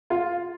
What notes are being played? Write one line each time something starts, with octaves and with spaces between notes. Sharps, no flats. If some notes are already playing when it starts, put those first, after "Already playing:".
F4